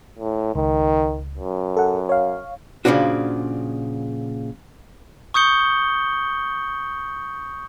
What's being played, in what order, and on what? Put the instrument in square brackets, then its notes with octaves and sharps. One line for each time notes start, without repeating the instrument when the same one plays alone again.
[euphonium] A2
[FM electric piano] C#2 [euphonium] D#3
[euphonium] F#2
[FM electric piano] A4 F#5
C#5 F5
[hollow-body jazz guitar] A#2 C#3 E3 F3 D4 F#4
[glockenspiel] C#6 D#6 G6 C#7 G7